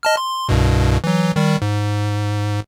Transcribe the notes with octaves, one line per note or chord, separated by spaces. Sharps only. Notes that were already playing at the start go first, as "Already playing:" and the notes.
D#5 A5 F6
C6
C2 G2 B2
E3 F#3
D#3 G3
G#2